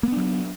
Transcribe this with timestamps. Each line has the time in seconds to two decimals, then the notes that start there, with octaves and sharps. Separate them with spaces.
0.03 A#3
0.08 B3
0.12 D4
0.17 F#3